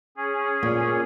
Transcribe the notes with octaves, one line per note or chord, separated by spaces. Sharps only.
C#4 G#4
A#2